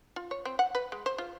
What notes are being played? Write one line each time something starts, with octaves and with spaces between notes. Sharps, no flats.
F4
C#5
C4
F#5
B4
G#3
C5
F4